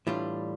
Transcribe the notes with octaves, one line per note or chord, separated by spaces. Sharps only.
A2 E3 G3 D4 F4